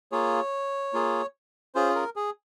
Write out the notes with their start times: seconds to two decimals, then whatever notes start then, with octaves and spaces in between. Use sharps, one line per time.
0.12 A#3 F4 G#4 C#5
0.93 A#3 F4 G#4
1.75 C#4 F4 G#4 C5
1.95 A#4
2.16 G#4